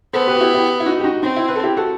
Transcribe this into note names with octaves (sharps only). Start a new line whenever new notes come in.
B3 A4 C5
G4 B4
F#4
E4 G4
E4 G4
E4
D#4 F#4
G4
D#4 F#4
C4 D#4
E4
B4
A4
E4 G4
F#4 A4